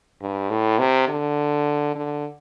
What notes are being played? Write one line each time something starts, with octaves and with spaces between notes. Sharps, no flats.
G2
A2
C3
D3
D3